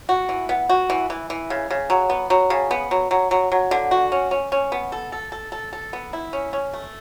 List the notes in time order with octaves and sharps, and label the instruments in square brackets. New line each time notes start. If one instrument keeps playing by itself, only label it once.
[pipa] F#4
E3
B3
F#4
E3
E3
E3
C#3
C#3
F#3
B3
F#3
C#3
B3
F#3
F#3
F#3
F#3
D3
F#4
C#4
C#4
C#4
B3
A4
A4
A4
A4
A4
B3
E4
C#4
C#4
A3